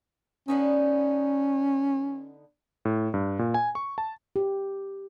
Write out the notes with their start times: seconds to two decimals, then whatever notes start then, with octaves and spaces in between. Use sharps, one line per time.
0.48 D3 B3 C#4 D#4
2.85 A2
3.14 G2
3.39 A#2
3.54 G#5
3.75 C#6
3.98 A5
4.36 G4